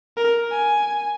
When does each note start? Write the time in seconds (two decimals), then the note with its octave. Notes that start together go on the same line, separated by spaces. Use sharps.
0.17 A#4
0.51 G#5